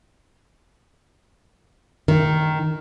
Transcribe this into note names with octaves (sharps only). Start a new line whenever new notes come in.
D#3